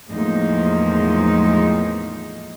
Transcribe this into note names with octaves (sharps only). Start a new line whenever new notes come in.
E2 A2 F3 G#3 A#3 D#4